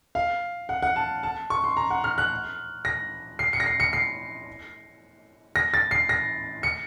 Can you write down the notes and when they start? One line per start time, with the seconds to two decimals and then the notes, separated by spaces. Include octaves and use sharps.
0.15 F5
0.69 F#5
0.83 F#5
0.96 A5
1.23 A5
1.50 C#6
1.64 C6
1.77 A#5
1.90 F#5
2.04 F6
2.18 F#6
2.85 A#6
3.39 C7
3.53 C#7
3.60 A#6
3.66 C7
3.80 C#7
3.93 C7
5.56 A#6
5.74 A6
5.91 C7
6.09 A#6
6.63 C#7